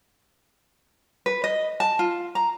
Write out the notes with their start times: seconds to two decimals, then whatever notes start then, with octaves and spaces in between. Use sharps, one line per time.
1.26 B4
1.44 D#5
1.80 A5
1.99 F4
2.35 A#5